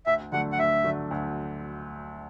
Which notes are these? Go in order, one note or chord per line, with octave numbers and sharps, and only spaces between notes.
D2 E5
D3 F#3 A3 D4 F#5
F#5
D2 E5
D3 F#3 A3 D4
D2